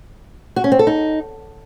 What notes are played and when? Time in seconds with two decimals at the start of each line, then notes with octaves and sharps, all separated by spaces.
0.56 F#4
0.64 C#4
0.72 C4
0.79 A4
0.87 D#4